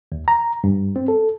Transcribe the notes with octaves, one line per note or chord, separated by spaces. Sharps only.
D#2
A#5
G2
C4
A4